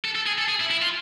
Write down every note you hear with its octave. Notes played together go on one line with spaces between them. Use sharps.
A4
A4
G#4
A4
G#4
E4
E4
F4